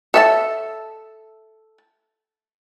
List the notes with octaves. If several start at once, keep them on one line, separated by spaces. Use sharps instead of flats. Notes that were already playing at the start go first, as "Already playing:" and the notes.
A4 C#5 E5 G#5 A5